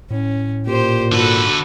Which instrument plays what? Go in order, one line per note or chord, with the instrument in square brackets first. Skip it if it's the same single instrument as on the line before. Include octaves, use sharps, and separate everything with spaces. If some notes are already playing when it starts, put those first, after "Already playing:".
[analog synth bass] A2 [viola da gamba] C#4
[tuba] A#2 [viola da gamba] G4 C5
[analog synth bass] G#2 [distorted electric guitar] D3 B4 [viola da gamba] F#4 A4